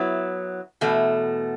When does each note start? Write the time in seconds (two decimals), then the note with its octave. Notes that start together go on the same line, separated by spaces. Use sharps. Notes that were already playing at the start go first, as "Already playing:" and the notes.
Already playing: F#3 B3 E4
0.81 E2 B2 A3